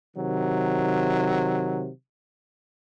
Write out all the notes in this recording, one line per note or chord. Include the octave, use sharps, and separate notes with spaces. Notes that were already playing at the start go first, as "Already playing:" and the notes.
C3 D#3 F#3